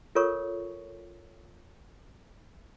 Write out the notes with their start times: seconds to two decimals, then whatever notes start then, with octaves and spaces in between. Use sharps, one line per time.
0.15 F4 A4 A#4 C#5 C#6